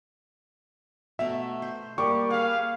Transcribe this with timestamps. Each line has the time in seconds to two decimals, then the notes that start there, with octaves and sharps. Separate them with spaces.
1.19 B2 A3 E5 A#5
1.62 C5
1.98 G3 A#3 C#6 D6
2.31 G#4 B4 F5